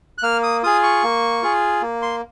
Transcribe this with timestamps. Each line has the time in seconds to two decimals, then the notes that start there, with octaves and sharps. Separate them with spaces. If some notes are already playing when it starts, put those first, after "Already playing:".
0.18 F#6
0.23 A#3 F6
0.43 D#6
0.63 F4 G#4 D#6
0.83 C#6
1.03 A#3
1.43 F4 G#4
1.82 A#3
2.02 C6